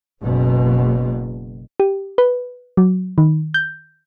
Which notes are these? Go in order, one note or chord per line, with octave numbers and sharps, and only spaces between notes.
F#1 B2
G4
B4
F#3
D#3
G6